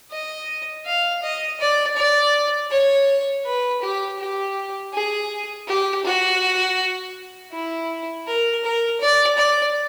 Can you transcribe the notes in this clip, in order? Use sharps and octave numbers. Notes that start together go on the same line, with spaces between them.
D#5
F5
D#5
D5
D5
C#5
B4
G4
G4
G#4
G4
F#4
E4
A#4
A#4
D5
D5